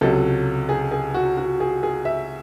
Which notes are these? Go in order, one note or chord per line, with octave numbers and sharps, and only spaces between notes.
C#2 C3 F#3 A4
G#4
G#4
F#4
F#4
G#4
G#4
E5